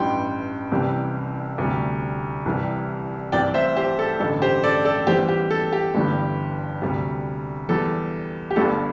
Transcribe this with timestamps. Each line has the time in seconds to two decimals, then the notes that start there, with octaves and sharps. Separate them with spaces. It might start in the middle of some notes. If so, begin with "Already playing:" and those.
Already playing: A1 G2 E3 G3 G5 C6
0.72 C2 C3 E3 G3
1.58 D2 C3 G3
2.46 C2 C3 E3 G3
3.32 C2 C3 E3 G3 D5 G5
3.54 C5 E5
3.76 G4 C5
3.99 A4
4.20 A1 G2 D3 A4
4.42 G4 C5
4.64 A4 D5
4.85 A4 D5
5.07 E2 E3 G3 G4 C5
5.29 G4
5.51 A4
5.73 G4
5.95 G1 G2 E3 G3
6.82 D2 C3 G3
7.69 E2 E3 G3 A4
8.51 G4
8.56 G1 G2 D3 G3 A4